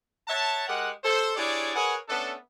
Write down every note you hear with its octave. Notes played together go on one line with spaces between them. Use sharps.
C#5 E5 F#5 A5
G#3 G4 A#4 F#5
A4 C5
D4 E4 G4 G#4 C#5 D5
G#4 A#4 B4 C#5 F#5 G#5
A3 B3 C#4 D4 A4